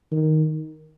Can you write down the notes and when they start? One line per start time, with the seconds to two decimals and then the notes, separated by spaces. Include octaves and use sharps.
0.12 D#3